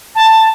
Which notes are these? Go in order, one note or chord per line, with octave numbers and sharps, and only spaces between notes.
A5